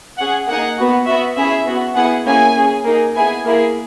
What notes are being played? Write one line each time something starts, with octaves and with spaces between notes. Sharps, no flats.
C#4 G#4 F#5
A#3 D#4 G#4 F#5
B3 F#4
B3 F#4 E5
C#4 E4 G#4 E5
B3 F#4
B3 E4 G#4 F#5
A#3 C#4 E4 G#4 G#5
C#4 G#4
A#3 D#4 G#4
B3 E4 G#4 G#5
A#3 E4 G#4